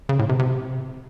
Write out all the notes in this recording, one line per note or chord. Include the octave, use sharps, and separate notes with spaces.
C#3
A2
C3
C3